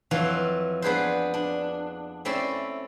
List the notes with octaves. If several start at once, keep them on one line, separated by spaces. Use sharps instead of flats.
F2 E3 F#3 F4 F5
B3 D4 G#4 B4 C5
D4
A3 C4 C#4 E4 D5 E5